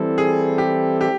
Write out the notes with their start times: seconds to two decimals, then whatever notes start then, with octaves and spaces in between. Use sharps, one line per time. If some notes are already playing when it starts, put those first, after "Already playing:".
Already playing: E3 G3 C4 E4 A4
0.18 G#4
0.58 G4
1.01 G4